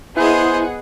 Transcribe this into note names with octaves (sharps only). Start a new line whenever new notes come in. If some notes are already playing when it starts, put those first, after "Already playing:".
B3 E4 G#4 C5 D#5 F#5